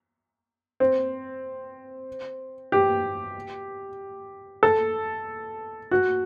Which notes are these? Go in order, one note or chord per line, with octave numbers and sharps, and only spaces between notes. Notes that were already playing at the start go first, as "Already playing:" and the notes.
C4
G4
A4
F#4